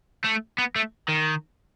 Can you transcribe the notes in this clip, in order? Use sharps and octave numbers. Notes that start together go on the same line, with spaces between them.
A3
B3
A3
D#3